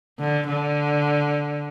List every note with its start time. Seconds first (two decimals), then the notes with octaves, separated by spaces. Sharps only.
0.19 D3
0.47 D3